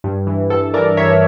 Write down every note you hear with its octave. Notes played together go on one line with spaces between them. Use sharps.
G2
E3
G2 A4
E3 A#4 D5
G2 C#5 E5